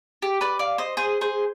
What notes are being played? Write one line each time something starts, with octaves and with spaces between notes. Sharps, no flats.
G4
B4 D5
D5 F5
C5 D#5
G#4 C5
G#4 C5